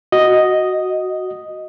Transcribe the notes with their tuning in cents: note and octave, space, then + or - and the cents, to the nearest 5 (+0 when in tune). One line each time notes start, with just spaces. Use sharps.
F#4 +0 D#5 +0